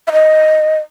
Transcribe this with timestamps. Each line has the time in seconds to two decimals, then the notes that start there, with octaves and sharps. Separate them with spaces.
0.08 E5
0.12 D#5